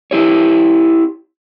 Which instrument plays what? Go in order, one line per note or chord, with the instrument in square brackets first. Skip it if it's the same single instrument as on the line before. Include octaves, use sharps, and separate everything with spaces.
[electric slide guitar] E4 G4 C#5